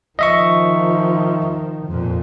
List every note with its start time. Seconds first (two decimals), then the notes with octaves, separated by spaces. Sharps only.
0.19 D#3 F3 D#5 E5 C#6
1.87 F2 A#2